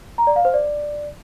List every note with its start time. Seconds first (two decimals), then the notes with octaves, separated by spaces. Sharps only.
0.18 A#5
0.27 D5
0.36 F5
0.45 C5
0.54 D5